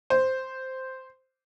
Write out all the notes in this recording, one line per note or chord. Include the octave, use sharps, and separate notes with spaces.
C5